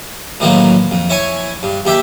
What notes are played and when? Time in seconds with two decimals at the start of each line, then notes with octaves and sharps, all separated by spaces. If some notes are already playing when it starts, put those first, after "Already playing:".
0.40 A2 D#3 E3 F#3 A#3
0.91 F2
1.09 E4 C#5 G#5
1.63 G2
1.85 D#2 G4 E5 G5